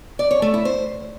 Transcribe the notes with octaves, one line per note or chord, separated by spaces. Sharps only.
D5
C#5
A3
E4
C5